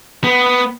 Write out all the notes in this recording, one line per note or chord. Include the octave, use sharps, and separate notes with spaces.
B3